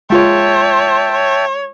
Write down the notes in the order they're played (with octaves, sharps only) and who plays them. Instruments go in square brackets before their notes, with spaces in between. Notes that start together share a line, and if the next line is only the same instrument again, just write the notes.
[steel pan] G#3 F4 [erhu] C#5 [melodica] E5 G5 A5
[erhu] C#5